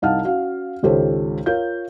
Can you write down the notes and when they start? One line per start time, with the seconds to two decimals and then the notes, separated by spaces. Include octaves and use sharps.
0.02 C2 D#4 F5 F#5 A5 F6
0.24 C#4 F#4 F5 F#5
0.83 G#1 C#2 G4 A4 C5 C#5
1.46 F4 A#4 C#5 F5 G6